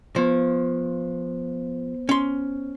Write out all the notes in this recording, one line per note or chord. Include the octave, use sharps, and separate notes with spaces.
F3 B3 C5
C#4 C6